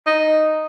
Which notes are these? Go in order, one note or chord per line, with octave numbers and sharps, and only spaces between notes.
D#4